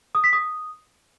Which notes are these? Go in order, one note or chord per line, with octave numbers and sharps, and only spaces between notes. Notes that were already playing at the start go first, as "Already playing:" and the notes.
D#6
B6
D#6